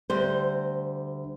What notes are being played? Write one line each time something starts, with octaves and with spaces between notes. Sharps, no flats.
D2 G3 C5